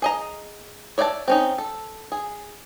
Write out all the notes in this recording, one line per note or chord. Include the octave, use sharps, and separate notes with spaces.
G#4 D#5 A#5
C#5 D5 E5 F#5 A5
C4 C#4 D#4
A4
G#4